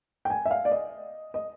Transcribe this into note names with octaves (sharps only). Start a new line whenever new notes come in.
G5
G#5
E5
F5
D5
D#5
D#5